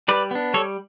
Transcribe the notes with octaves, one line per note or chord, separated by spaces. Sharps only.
G3 B4 D5
B3 D4
G3 A4 C#5